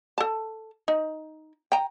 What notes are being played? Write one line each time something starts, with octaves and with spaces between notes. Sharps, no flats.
A4 A5
D#4
G5 A#5